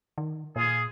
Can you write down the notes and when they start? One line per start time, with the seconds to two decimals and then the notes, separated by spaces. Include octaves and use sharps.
0.18 D#3
0.56 A#2 F4 G#4